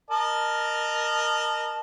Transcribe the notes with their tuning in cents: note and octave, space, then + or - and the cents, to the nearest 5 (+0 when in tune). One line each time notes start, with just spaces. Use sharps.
A#4 +0 D#5 -30 A5 -10